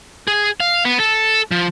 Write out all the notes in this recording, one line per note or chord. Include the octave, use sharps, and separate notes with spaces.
G#4
F5
B3
A4
F3